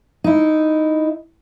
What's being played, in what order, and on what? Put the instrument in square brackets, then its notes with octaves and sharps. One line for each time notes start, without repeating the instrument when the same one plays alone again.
[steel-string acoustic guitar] D#4 E4